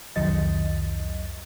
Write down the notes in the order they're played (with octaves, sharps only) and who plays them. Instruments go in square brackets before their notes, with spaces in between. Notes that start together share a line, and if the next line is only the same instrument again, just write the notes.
[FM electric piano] C2 F2 D#3 F#3 D#5 A6